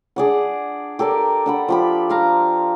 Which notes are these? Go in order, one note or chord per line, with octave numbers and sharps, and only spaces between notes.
D4 G#4 D5 F#5
G4 A4 A#4 D5
D4 F#5 B5
F3 G4 B5
C5 F5 A#5